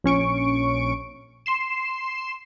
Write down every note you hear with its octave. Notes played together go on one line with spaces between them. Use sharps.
A#1 C#4 C#6 D7
C6 C7 E7